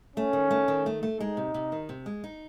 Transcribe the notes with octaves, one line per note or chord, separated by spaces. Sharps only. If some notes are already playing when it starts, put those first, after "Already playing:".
A3 C#4
D#3
A3
D#3
A3
A3
G#3 D#4
C3
C3
D#3
C3
G#3
D#4